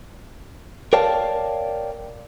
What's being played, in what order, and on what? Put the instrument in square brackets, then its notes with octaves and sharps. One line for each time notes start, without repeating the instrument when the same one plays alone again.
[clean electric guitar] A#4 C#5 D5 F5 G5 A5